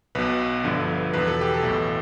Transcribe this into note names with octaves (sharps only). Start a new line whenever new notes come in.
B1 B2 B4
G1 G2 D3 F3
E2 B2 B4
A4
G4
A4
B1 A2 E3